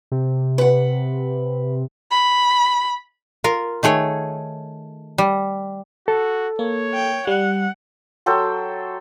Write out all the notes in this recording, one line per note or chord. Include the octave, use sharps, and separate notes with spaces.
C3
B4 F#5
B5
F4 A#4
D#3 A3 G#4 C#5
G3
F#4 A4
A#3 C#5
G5
G3 F#5
F#3 A4 G5 C6